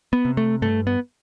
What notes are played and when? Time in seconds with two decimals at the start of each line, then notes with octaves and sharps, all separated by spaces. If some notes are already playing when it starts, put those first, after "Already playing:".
0.13 B3
0.25 C3
0.37 A3
0.62 G2 A3
0.87 B3